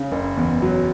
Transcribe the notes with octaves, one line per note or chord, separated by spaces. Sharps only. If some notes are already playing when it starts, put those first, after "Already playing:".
Already playing: C#3
F#1
E2
F#3